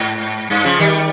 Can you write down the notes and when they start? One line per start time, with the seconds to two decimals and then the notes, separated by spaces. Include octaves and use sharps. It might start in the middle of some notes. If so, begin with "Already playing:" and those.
Already playing: G#2
0.50 G2
0.64 C#3 F3
0.79 D#3 G3